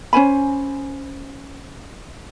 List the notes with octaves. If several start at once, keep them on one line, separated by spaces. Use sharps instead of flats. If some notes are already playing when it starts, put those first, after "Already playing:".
C#4 C5 G#5 B5